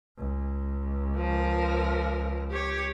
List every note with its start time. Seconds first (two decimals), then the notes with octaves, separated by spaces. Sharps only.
0.18 C#2
1.16 F3 A#4
2.50 G4 C#5